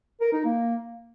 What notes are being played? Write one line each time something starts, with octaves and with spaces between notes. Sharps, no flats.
A#4
D#4
A#3